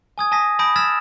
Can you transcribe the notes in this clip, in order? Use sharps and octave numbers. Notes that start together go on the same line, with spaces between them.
G#5 D#6 G#6
G#5 A5 D#6 A#6 B6
A5 B5 D#6 G6 A#6 D7
E6 F6 G#6 A6 B6 E7